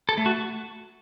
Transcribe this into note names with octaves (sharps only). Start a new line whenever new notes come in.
A4
A3
F#4